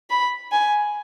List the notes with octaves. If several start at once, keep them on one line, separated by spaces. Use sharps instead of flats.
B5
G#5